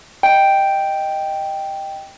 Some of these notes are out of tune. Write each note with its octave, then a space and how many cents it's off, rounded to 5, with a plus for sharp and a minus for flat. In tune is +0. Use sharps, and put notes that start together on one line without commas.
D#5 +0 G5 +0